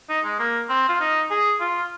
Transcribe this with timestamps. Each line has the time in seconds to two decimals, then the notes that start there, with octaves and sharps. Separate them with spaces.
0.09 D#4
0.25 G#3
0.39 A#3
0.70 C4
0.89 F4
1.01 D#4
1.31 G#4
1.60 F4